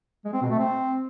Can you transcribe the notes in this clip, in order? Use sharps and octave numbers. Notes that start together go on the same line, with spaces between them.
G#3
C4
B2
A3
C4